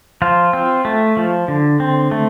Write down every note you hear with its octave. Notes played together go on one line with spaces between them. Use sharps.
F3 F4
C4
A3
F3
D3
C4
A3